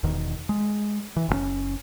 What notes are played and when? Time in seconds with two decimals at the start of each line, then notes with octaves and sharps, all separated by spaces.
0.03 E1 E2 D#3
0.49 G#3
1.17 E3
1.29 F#1 A#2 C#4